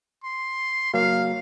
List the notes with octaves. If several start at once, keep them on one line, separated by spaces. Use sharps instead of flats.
C6
F#3 A#3 F5